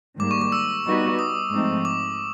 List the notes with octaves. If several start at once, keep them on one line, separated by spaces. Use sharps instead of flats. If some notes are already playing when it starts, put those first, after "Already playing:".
G#2 D#3 G3 A#3 D6
C#6
D6
E6
G3 B3 D#4 F#4 B4
D#6
G#2 F3 A3 C4 D#4
D6